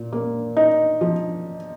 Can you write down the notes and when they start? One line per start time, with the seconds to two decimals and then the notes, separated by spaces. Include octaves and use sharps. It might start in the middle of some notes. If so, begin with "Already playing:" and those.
Already playing: A#2
0.13 A#3
0.57 D#4
1.01 F3